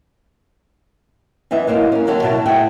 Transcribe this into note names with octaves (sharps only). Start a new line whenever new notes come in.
F#2 E3 B3 D#5 E5
F#3 G#3 A#3 C4 D#4
A#3 C#4
D#2 D3 F#3 A#3 F#4 A4
B2 F#3 E4 A5
A2 G#4 E5 F#5 G5